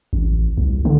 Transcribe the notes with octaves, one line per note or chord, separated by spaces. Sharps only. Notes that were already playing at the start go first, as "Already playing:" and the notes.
A1
C2
D3